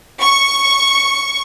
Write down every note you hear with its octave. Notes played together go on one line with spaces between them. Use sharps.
C#6